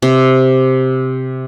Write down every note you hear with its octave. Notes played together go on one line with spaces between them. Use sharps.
C3